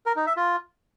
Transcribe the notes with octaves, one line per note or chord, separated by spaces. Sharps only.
A#4
D#4
E5
F4